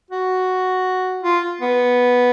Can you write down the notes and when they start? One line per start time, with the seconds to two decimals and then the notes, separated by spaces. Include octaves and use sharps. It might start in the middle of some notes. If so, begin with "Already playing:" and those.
0.11 F#4
1.23 F4
1.61 B3